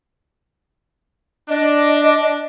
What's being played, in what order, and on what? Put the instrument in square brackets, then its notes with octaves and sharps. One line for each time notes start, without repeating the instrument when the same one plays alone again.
[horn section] D4 [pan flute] D#5